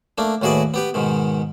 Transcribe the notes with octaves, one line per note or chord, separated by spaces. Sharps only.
A3 A#3 D4
D#2 A2 F#4 G#4 B4 D5
B3 G4 B4
G#2 B2 D#3